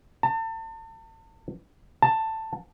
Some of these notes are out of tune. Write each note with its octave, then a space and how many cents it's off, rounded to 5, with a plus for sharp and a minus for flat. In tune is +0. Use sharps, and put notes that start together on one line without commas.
A5 +35
A5 +10